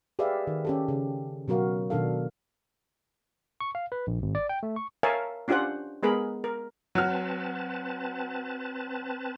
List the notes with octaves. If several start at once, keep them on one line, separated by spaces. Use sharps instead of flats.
G4 G#4 B4 D5 E5 F5
D#3
C#4 G4 A4
C#3
B2 F#3 F#4 A#4 F5
B2 D#3 D4 A4 F5
C#6
F5
B4
A#1
G#1
D5
G5
A3
C#6
A#4 C#5 E5 F5 G#5 A5
C#4 D4 F4 G4 C5 F#5
G#3 B3 G#4 A#4 B5
A#4
F#3 C4 B4 A5 F6